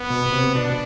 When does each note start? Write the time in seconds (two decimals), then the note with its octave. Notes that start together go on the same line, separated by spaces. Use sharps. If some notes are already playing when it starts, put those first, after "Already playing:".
Already playing: B3
0.10 B2
0.32 C3
0.54 B2 D4